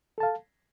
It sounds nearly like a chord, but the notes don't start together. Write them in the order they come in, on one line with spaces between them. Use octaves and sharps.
A4 A5 F5